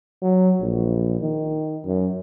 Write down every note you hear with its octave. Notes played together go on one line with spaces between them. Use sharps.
F#3
A#1
D#3
F#2